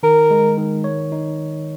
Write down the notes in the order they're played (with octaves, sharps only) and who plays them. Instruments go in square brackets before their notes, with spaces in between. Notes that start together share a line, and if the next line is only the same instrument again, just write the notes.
[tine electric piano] D#3 [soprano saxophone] A#4
[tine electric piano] G#3
D#3
C#5
D#4